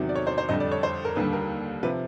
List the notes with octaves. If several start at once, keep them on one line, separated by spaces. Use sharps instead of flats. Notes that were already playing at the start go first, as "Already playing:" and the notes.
Already playing: E2 C3 D#3 F#3
D5
C#5
C5
C5
F2 D3 G3 D#5
D5
C#5
C5
A#4
D#2 D3 G3 B4
A#4
C3 F3 B4